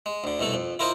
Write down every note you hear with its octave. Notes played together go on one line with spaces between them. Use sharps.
G#3
D2 D3
C2 B2 A3 A4
F2
E4 F4 A#4 C5 D#5 F5